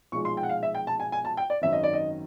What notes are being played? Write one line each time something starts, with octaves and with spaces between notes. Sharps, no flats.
B1 A#2 F3 G#3 C#6
C6
G5
F#5
F5
E5
G5
A5
G#5
G#5
A5
G5
D5
G#1 F#2 D#3 E5
D#5
D5
D#5